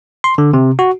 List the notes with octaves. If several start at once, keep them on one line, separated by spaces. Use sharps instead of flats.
C6
D3
C3
F#4